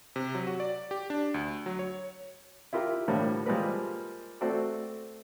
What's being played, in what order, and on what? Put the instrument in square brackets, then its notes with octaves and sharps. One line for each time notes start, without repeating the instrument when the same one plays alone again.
[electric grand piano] C3
F#3
F#4
D5
G4
D4
D2
F#3
C#5
[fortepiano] E4 F4 G4 A#4
A2 D3 F3 G3 A#3
F3 G3 G#3 A#3 A#4 B4
A3 C4 F#4 A4 C5 D5